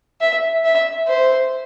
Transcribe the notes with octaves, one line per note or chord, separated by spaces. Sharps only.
E5
E5
C5